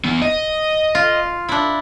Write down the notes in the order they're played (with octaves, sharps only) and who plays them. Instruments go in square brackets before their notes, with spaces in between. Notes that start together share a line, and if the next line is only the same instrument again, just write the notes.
[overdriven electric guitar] E3 B3
D#5
[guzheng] F4
D4 E4